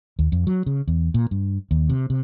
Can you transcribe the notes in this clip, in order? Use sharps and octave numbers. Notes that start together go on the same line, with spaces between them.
D#2
F2
F#3
C#3
E2
A#2
G2
D#2
C3
C3